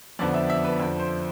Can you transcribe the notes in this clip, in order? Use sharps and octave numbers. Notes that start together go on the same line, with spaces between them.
F2 D3 F3 B3 D4 D5
E5
E5
B4
F2 D3 F3
C5